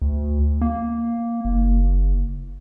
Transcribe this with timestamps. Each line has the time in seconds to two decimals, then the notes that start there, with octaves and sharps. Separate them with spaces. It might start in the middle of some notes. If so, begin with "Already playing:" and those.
0.02 D2
0.61 A#3
1.45 F#1